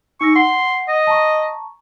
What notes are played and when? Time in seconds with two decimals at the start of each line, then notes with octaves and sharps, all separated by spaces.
0.21 D#4 C#6 E6 A#6
0.35 F#5 C6
0.88 D#5
1.07 A5 A#5 C#6